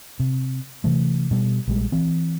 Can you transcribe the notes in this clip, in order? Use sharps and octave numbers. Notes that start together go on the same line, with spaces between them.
C3
C3 E3 A3
B2 G3
A#1 G3 G#3
E3 C4